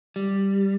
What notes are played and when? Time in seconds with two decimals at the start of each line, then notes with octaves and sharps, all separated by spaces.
0.16 G3